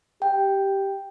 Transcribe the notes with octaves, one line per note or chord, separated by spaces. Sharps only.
G4 G5